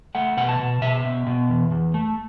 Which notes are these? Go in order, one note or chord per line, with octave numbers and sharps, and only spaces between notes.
A3 F#5
B2 F#5
A5
B2
B2 E5
B2
B2
E2
E2
A3